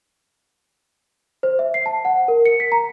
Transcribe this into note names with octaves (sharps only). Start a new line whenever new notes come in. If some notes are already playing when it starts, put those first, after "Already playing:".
C5
E5
C7
A5
F#5
A#4
C#7
B6
A#5